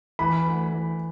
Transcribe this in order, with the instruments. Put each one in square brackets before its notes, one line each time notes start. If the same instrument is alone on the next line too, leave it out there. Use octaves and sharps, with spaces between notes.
[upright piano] E3 [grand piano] B5
[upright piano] D2
E3